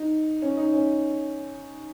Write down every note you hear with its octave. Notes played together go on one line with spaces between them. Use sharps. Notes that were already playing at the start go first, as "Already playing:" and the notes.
Already playing: D#4
C#4
D#4
C#4